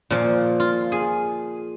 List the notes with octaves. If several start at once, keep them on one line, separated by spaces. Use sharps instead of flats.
A#2 F3
F4
G#4